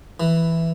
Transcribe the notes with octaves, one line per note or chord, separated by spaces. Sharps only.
E3